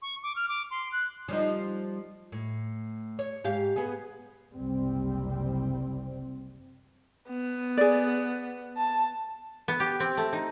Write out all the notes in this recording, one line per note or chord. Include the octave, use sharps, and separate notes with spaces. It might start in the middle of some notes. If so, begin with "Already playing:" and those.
C#6
D6
F6
D6
C6
F#6
F3 G3 D#4
A2
C#5
G#2 G4 F5
B3 G#4
F#1 C2 C3 G3 C4
B3
G#4 D5
A5
B3
G4
C4
A3
D#4